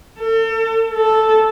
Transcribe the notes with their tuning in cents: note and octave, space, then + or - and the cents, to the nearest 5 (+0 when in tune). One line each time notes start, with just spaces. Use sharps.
A4 +40
A4 -5